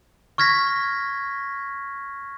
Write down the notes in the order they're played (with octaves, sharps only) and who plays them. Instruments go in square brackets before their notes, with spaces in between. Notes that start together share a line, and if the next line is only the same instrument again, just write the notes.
[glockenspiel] C#6 F6 G#6 A#6 B6